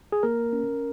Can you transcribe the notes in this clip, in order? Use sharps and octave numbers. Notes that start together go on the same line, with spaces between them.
G#4
A#3 A#4
C#4